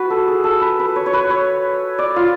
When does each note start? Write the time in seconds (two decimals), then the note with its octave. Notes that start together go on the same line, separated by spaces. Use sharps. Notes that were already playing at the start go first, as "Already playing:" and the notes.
Already playing: F#4 B4
0.10 A4
0.27 G#4
0.44 A4
0.61 B4
0.79 B4
0.96 C#5
1.06 C#5
1.13 B4
1.30 C#5
1.99 D5
2.16 F4